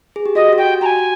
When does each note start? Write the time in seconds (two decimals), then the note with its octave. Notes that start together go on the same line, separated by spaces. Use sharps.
0.16 G#4
0.26 G4
0.35 F#4 D#5
0.53 F#4
0.57 G4 G5
0.81 F#4 G#5 A#5